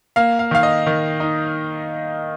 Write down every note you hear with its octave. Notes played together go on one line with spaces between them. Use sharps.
A#3 F5
F5
D#3 F5
D#5
D#3
D#4